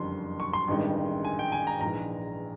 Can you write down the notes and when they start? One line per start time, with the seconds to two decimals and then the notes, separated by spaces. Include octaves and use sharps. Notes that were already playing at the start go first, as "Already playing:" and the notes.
Already playing: F#1 F2 D3 G3 C6
0.40 C#6
0.53 C6
0.68 A1 G2 D#3 G#3
1.25 G#5
1.39 G5
1.52 G#5
1.67 A#5
1.81 A#1 G#2 E3 G#3 A#5